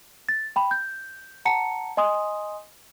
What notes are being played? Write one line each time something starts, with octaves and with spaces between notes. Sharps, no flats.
A6
G5 B5
G6
F#5 A5 A#5 C#7
D#5 G#5 C6 D#6